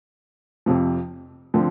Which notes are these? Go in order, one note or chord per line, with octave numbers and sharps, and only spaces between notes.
F2 C3 F3
D3 F3 C4